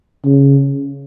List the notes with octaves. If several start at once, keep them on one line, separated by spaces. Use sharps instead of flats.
C#3